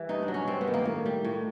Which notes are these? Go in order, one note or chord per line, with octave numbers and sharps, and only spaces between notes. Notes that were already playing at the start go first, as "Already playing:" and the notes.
Already playing: E3 G3
G2 D#4
D4
F#3
C#4
G2 C4
B3
D#3
A#3
A2
G3
A2